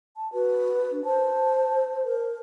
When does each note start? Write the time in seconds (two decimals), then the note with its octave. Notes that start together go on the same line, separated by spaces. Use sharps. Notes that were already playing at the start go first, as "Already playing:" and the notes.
0.17 A5
0.33 F#4 B4
0.92 D4
1.05 C5 A5
2.04 A#4